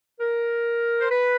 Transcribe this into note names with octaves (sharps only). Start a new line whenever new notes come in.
A#4
C5
B4